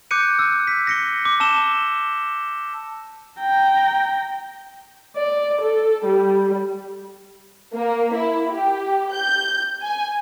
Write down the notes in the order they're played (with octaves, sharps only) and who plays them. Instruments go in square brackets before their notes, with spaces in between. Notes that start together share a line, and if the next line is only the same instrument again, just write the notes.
[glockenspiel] D6 F#6 G6 C#7 D#7
E6
B6
A#6 C#7 G7
D6
A5 E6 E7 G7
[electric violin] G5 A#5
[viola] D5
A4
G3
[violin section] A#3
E4
G4
G6
G#5